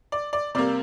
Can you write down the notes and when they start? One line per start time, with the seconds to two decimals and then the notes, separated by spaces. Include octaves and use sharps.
0.12 D5
0.33 D5
0.55 C3 G3 A#3 D5